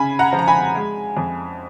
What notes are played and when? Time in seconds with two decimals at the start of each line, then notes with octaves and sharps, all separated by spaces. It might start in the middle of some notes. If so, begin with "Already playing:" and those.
Already playing: C#3 G#5 B5
0.19 F#5 A#5
0.33 F3
0.39 A#5
0.48 G#5 B5
0.75 G#3
1.17 F2